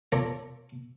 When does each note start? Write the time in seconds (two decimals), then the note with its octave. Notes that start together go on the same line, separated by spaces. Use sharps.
0.12 F4 A4 A#4 C#5 D5